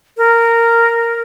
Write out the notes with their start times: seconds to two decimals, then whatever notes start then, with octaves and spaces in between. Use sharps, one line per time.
0.17 A#4